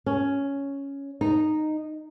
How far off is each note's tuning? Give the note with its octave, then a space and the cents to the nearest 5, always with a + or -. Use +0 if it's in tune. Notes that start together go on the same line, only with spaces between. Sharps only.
C#4 +5
D#4 -10